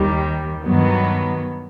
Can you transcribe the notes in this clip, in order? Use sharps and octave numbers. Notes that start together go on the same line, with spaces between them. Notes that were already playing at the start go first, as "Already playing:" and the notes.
Already playing: D#2 D#3 G3
G2 D#3 F#3 B3